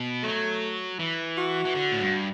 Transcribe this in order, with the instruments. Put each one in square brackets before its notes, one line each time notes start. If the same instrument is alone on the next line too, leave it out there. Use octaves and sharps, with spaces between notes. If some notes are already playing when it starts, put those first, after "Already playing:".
Already playing: [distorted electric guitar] B2
[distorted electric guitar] F#3 [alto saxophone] A3
[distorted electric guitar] E3
[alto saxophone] F#4
[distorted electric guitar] E3
D3
A2
G2